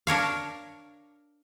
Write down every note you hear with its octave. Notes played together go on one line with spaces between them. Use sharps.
D4 A#4 C#5 F5